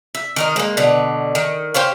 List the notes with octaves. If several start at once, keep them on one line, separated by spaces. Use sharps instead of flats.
E5
D#3 A#4 D#5
G#3 A#3
B2 D3
D#3
G4 C5 C#5 F5